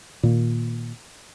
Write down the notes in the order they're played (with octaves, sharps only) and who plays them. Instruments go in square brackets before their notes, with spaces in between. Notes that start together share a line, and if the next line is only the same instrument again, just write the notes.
[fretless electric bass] A#2 D#3 A#3